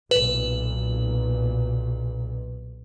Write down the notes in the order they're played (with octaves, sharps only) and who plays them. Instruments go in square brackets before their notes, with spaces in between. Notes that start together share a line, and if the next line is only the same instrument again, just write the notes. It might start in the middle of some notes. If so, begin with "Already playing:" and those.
[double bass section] B1 A#2 [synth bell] B4